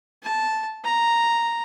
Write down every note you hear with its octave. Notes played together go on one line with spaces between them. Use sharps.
A5
A#5